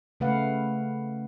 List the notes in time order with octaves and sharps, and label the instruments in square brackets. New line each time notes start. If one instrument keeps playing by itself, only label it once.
[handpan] C#3 A3 B4 F5 F#5